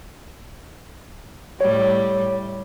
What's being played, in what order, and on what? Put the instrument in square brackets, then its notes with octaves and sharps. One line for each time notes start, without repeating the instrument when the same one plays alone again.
[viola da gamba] A2 G3 [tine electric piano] C#5